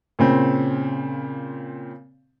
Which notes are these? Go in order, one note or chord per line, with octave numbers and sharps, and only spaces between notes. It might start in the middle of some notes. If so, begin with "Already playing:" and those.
A#2 C#3 C4